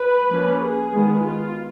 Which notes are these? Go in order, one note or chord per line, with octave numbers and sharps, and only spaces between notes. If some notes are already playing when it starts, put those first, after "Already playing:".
Already playing: B4
F3 A#3 C#4
G#4
D#3 G#3 B3
F4